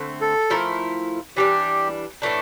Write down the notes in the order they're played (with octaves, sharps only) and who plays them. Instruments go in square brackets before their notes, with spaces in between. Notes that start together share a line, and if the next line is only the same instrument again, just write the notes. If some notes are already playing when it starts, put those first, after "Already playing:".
Already playing: [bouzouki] D3 A3 C4
[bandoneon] A4
[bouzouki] F3 A3 E4 A#4
[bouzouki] E3 G3 D4 [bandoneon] G4
[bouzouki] A2 E3 A3 D4